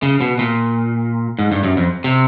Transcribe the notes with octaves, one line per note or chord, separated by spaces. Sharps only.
C#3
B2
A#2
G#2
G2
F#2
F2
C3